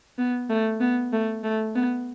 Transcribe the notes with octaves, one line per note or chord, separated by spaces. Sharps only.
B3
A3
B3
A3
A3
B3